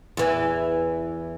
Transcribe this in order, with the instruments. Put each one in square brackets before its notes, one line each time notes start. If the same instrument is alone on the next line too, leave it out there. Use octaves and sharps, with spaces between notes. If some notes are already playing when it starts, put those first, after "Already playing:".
[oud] E2 E3